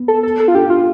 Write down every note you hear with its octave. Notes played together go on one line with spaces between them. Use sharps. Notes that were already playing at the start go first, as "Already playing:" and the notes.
Already playing: B3
A4
A4
A4
F4
D4 G4
F4